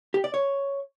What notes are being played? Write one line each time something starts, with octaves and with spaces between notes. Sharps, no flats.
G4
D5
C#5